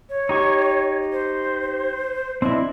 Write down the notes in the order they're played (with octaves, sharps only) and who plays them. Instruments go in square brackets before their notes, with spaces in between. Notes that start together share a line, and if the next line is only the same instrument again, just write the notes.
[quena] C#5
[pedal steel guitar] D#4 G4 C#6
[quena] C5
[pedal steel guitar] C4 D4 E4 [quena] D#5